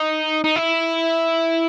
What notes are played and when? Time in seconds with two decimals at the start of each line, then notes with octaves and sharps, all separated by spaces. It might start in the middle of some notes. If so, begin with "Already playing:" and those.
Already playing: D#4
0.44 D#4
0.56 E4